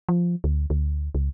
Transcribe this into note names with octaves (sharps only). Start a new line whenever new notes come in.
F3
D2
D2
C#2